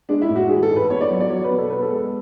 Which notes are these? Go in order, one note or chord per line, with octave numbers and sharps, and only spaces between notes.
G#3 D4
E4
A2
F#4
E3 G#4
A4
G#2
B4
B3 C#5
D5
F#3 C#5
D5
F#3 C#5
B4
B2
A4
B3 B4
A4
G#3